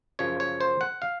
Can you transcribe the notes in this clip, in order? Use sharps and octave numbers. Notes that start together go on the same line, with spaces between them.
F#2 C#3 F3 C#5
C#5
C5
F#5
F5